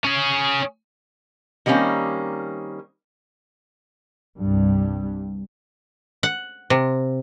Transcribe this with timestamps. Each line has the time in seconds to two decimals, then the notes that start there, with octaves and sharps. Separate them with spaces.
0.04 C#4 G#4
1.66 D#3 G3 A#3 C4 C#4
4.39 C2 G2 G3
6.23 F#5
6.70 C3